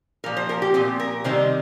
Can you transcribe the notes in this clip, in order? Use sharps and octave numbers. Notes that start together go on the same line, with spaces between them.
A#2 F3 A#4
C5
A#4
G4
A#2 F3 C4
A#4
C3 D#3 G3 C5